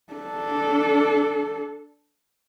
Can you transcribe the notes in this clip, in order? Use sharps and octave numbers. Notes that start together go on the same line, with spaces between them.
D4 A4